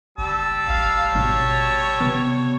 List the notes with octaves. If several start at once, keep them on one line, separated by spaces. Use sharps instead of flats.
F#1 G3 A5 E6
A1 F5
G#1 B2 C#5
C3 B3